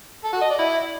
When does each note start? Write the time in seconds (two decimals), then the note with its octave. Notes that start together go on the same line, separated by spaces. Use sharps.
0.24 A4
0.33 F#4
0.42 D#5
0.50 D5
0.59 E4